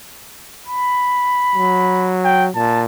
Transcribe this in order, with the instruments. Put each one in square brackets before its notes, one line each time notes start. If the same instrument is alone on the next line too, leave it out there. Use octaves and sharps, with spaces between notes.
[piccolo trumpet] B5
[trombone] F#3
[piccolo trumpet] G5
[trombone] A#2 [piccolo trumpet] A5